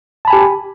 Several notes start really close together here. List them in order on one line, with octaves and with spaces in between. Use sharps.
A5 B5 G#5 G4